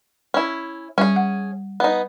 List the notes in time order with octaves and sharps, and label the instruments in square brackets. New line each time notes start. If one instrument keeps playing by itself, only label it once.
[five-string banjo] C#4 E4
[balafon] G3 [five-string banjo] C#4 G#4
[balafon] F#5
[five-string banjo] B3 D#4